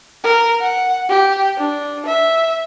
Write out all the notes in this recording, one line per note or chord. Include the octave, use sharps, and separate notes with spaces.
A#4
F#5
G4
D4
E5